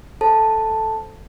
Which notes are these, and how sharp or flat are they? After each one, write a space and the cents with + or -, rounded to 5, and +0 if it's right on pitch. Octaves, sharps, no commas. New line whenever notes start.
A4 +0 C5 +0 A5 +0